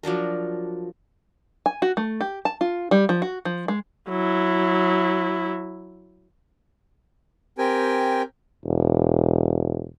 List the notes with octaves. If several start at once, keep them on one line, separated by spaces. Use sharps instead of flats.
F3 F#3 D4 A#4
G#5
F#4
A3
G4
A5
F4
G3
F3
F#4
F3
G#3
F#3 E4
C4 G4 A#4 G5 G#5
E1